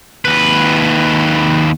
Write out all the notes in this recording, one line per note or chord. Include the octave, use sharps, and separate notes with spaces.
D#2 B4